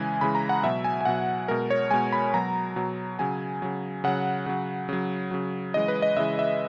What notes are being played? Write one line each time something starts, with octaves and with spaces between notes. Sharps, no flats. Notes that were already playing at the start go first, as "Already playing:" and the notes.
Already playing: C#3 E3 G#3 G#5
C#3 E3 G#3 B5
A#5
F#5
B2 F#3 E5
G#5
G#5
B2 F#3 F#5
B2 G#3 A#4
C#5
B2 G#3 G#5
B5
B2 F#3 A#5
B2 F#3
C#3 F#3 G#5
C#3 F#3
C#3 F#3 F#5
C#3 F#3
C#3 F#3
C#3 F#3
C#3 E3 G#3 D#5
B4
D#5
C#3 E3 G#3 E5
E5